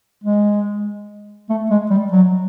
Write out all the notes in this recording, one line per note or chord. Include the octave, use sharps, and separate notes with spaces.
G#3
A3
G#3
G3
F#3